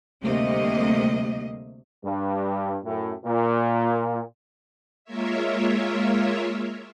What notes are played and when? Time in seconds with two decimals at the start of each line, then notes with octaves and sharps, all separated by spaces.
0.23 D2 C3 G3 A3 A#3 D#5
2.05 G2
2.85 F#2 A2
3.25 A#2
5.05 G#3 A#3 F4 A#4 C#5 E5